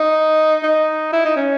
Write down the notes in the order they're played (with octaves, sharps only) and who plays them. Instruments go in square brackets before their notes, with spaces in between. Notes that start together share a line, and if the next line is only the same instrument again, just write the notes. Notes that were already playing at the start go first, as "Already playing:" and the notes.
Already playing: [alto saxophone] D#4
D#4
E4
D#4
C#4